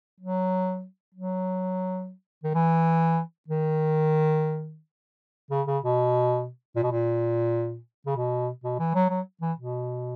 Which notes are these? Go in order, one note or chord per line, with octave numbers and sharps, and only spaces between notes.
F#3
F#3
D#3
E3
D#3
C#3
C#3
B2
A#2
B2
A#2
C#3
B2
B2
E3
F#3
F#3
E3
B2